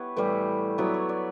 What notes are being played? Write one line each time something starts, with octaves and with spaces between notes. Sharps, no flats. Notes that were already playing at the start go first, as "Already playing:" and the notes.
Already playing: B3 E4 G4 B4 C#5
A2 E3 G3
F#3 B3 E4 D5
C#5
D5